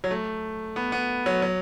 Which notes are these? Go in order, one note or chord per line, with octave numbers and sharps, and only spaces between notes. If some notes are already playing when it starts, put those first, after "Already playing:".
F#3
A3
B3
B3
F#3
F#3